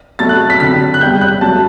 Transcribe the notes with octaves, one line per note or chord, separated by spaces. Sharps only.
B2 F#3 A3 A6
F#6
F#6
B6
D3 F#3 C4 B6
F#6
E2 C3 G3 G6
F#6
F#2 F#3 A3 A5